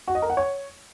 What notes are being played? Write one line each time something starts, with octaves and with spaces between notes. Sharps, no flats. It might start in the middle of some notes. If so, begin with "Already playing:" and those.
F#4
D#5
A#4
F#5
C#5